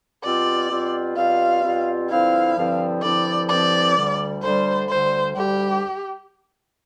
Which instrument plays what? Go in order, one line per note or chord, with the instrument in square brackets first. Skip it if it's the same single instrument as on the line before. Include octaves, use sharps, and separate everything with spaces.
[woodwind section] B2 G3 C4 F4 [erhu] D5
[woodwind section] B2 G3 C4 F4
[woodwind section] B2 G3 C4 F4 [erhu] F5
[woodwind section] B2 G3 C4 F4
[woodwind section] G2 D3 F3 C4 E4 [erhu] F5
[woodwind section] G2 D3 F3 C4 E4
[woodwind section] G2 D3 F3 C4 E4 [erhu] D5
[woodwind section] G2 D3 F3 C4 E4 [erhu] D5
[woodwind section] D2 D3 G3
[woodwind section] D2 D3 G3 [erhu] C5
[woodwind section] D2 D3 G3 [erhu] C5
[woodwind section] D2 D3 G3 [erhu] G4